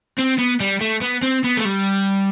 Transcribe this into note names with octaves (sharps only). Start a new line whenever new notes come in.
C4
B3
G3
A3
B3
C4
B3
A3
G3